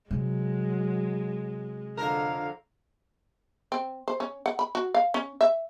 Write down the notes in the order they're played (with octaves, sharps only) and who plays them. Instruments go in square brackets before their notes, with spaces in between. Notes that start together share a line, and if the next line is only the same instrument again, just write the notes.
[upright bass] C3 [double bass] F#3 [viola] G#3
[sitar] F2 A#4 [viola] D3 F5
[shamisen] C4
C5
C#4
F#5
B5
F#4
F5
C#4
E5